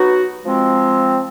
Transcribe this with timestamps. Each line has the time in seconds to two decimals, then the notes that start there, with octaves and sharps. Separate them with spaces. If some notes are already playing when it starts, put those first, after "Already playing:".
Already playing: F#3 B3 D#4 F#4
0.45 F3 G#3 C4